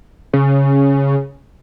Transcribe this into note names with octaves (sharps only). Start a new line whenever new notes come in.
C#3